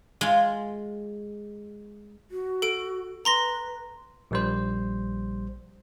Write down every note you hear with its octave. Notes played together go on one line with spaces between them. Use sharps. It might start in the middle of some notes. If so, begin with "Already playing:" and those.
G#3 F4
F#4
A4 D7
B4 A#5 C6 A#6
A#1 G3 C5